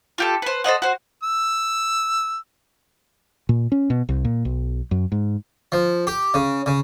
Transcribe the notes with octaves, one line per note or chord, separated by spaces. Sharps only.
F4 G4 A4
B4 C5
A4 C5 D#5 F#5
F#4 C5
E6
A#2
C#4
B2
C2
A#2
B1
F#2
G#2
F3
G4
C#3
C#3